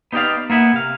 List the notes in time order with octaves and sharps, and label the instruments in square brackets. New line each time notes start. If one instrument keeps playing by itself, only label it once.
[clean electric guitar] B3 D#4 G4 A#4 D5 F5
A#3 B3 E4
C3 F5